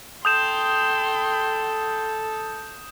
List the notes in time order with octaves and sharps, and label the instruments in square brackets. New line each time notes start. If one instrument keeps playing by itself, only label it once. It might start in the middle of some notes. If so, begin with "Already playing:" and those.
[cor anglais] A4 [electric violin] G5 C6 [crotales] D#6 G6 E7